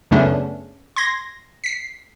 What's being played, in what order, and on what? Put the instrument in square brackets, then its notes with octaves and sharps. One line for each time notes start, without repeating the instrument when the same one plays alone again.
[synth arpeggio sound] F#2 C#3 A3 B3 C#4 D4
C6 G#6 A#6
B6 C7